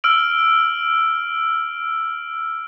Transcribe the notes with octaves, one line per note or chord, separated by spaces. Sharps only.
E6 F6 D7 F#7